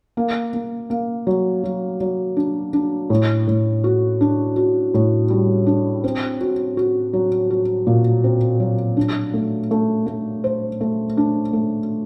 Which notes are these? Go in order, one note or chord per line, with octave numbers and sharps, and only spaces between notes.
A#3
A#3
A#3
F#3
F#3
F#3
D4
D4
A2
A2
F#4
D4
F#4
A2
G3
D4
C4
F#4
F#4
F#3
F#4
A#2
C4
F#3
D4
A3
A3
A3
C5
A3
D4
A3